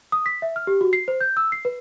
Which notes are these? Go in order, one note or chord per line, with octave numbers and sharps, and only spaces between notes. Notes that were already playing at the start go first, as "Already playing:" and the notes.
D#6
B6
E5
F6
G4
F#4
C7
C5
G6
E6
C7
B4